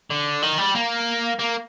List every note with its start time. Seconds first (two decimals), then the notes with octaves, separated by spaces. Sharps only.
0.10 D3
0.42 D#3
0.58 G3
0.75 A#3
1.39 A#3